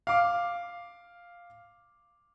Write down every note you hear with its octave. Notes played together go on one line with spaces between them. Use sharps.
F5 D6